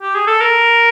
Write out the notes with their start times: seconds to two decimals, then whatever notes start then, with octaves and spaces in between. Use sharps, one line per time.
0.02 G4
0.15 G#4
0.27 A4
0.41 A#4